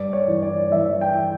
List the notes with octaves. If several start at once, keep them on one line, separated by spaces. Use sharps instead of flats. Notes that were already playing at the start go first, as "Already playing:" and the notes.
Already playing: G2 D5
C#5
E3
D5
E3 E5
G5